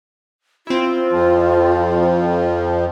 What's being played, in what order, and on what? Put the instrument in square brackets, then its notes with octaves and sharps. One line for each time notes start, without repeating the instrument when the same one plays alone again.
[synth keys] C4 E4 [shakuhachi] F4
[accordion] F2 F3